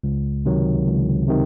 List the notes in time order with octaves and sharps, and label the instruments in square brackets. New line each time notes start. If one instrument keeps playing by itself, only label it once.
[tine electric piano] C#2
C3 D#3 F#3
C#2
C3 D#3